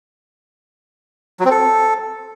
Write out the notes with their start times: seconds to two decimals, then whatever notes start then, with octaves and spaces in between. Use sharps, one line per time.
1.40 F#3
1.45 C4
1.51 A4